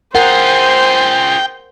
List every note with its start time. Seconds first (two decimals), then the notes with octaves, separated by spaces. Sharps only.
0.15 F4 G#4 A#4 C5 F#5 G5